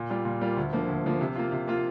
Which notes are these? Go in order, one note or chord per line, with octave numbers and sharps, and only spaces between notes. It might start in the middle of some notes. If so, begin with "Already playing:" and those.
Already playing: A#2
G3 A#3 F4
A#2
G3 A#3 F4
D2
D3 F3 A#3
D2
D3 F3 A#3
C3
A#3 F4
C3
A#3 F4